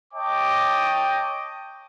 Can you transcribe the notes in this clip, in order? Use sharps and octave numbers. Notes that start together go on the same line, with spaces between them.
C#5 D#5 G5 A5 D6